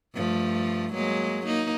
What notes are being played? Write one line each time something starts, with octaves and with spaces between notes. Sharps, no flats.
G2 F3 A3
F#3 G#3 A#3
A#3 D#4